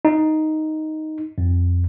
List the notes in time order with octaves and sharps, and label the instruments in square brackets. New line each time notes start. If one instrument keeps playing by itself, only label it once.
[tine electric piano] D#4
F2